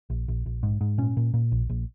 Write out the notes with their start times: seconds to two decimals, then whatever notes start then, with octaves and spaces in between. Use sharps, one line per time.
0.10 A#1
0.28 A#1
0.46 A#1
0.63 G#2
0.81 G#2
0.98 A#2 C#4
1.17 A#2
1.34 A#2
1.52 A#1
1.70 A#1